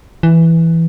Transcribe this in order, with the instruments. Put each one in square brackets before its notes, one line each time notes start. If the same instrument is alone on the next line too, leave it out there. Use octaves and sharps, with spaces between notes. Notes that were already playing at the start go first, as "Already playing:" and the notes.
[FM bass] E3